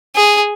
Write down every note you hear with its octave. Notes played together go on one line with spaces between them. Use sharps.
G#4